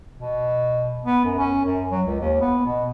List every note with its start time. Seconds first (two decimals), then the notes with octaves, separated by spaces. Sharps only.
0.18 B2
1.05 B3
1.25 F#2
1.38 C#4
1.65 F#2
1.91 F#3
2.06 C#2
2.20 D#2
2.41 B3
2.66 B2